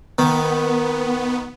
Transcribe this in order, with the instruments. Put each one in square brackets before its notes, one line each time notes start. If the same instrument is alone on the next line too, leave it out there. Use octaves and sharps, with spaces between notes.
[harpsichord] D#3 [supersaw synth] B3